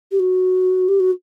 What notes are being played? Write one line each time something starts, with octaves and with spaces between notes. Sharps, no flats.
G4
F#4
G4
F#4